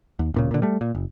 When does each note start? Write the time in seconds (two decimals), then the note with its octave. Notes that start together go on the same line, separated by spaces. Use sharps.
0.19 D#2
0.34 D1 A#2 C#3
0.51 A#2 D3
0.62 G3 A3
0.81 A#2
0.95 F#1